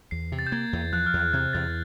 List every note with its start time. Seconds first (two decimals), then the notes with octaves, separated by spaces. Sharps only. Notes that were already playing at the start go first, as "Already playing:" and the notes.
0.11 E2 C7
0.32 C3
0.39 A6
0.47 G6
0.52 A#3 G#6
0.73 E2
0.93 F3 F#6
1.06 F6
1.14 E2
1.19 F#6
1.33 C3 G#6
1.53 E2 A6